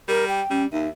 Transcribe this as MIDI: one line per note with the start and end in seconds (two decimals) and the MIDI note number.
0.09 0.41 55
0.09 0.25 70
0.28 0.61 79
0.50 0.65 55
0.50 0.67 61
0.73 0.89 39
0.73 0.87 63
0.73 0.90 76